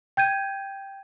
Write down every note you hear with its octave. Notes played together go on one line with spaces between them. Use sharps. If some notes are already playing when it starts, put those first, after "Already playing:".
G5 G6 G#6 D#7